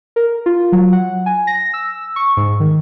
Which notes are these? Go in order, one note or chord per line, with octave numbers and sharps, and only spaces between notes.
A#4
F4
F#3
F#5
G#5
A#6
E6
C#6
G#2
D#3